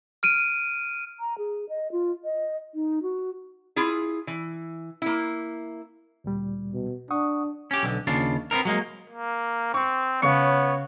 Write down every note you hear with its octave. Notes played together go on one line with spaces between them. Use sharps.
F6 D7 D#7
A#5
G#4
D#5
F4
D#5
D#4
F#4
E4 F4 G#4
E3
A#3 E4
D2 A#2 G3
B2
D4 F#5 C#6 D#6
C#4 G4
B1 D3
D#2 C#3 D4 F4
B3 C4 D#4 A#4
F#3 G#3 A#3
A#3
C4 C#6
C#3 B3 C#5 C#6 C#7